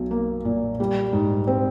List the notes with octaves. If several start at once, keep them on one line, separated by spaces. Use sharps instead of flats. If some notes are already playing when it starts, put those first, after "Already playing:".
Already playing: B1 F#3
A#3
A#2
G3
G#2
C4